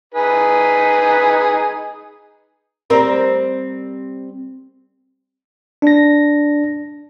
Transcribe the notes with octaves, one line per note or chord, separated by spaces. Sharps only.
D#4 G#4 B4
G3 C4 A#4
D4 A#6